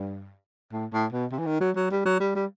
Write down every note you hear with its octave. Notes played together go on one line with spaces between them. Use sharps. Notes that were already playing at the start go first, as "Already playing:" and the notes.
Already playing: G2
A2
A2
B2
C3
E3
D#3
F#3
F#3
G3
F#3
G3
G3